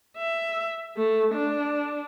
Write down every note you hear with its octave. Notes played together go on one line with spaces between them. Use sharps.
E5
A3
D4